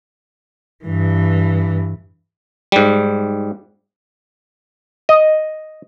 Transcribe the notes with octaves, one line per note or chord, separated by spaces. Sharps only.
G2 E3
G#2 G3
D#5